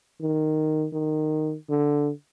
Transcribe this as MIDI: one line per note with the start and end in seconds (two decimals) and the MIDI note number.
0.21 0.86 51
0.93 1.56 51
1.70 2.11 50